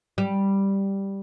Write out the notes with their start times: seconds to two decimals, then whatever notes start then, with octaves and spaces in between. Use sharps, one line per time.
0.18 G3